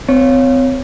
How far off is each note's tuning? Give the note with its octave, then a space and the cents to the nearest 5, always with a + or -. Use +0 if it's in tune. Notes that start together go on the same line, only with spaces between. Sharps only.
C4 -35 C#5 +0